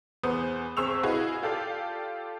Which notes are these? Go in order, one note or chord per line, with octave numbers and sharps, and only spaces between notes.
E2 B3 C5 G#5 D#6
G#1 C4 G#4 C#6 E6 F7
E4 F#4 G#4 B4 D#5 F5
F4 G4 A4 D5 F5